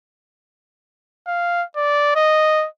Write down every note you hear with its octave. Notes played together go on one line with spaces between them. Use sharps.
F5
D5
D#5